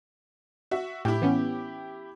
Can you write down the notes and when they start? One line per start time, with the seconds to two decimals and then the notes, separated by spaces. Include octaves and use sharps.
0.71 F#4 E5
1.05 A2 E4 G4
1.22 E3 B3 C#4